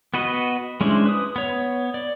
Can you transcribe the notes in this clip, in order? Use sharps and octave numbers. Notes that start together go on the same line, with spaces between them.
B3 F#4 B4 D#5
G#3 C#4 D4 E4 C5
B4 D#6
B3 C#5
D5